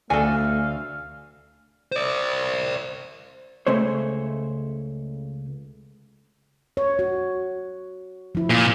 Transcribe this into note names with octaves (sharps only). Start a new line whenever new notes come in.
D2 A3 D4 F#4 A4 F5 G#5
C5 D5
C#2 C#3 A3 C5 C#5
C#5
F#4
F3 E4
A#2